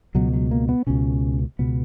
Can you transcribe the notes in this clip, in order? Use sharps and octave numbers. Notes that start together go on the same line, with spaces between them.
C#2 B2 F#3
F#3
A#3
B3
C#2 B2 C#4
C#2 B2 B3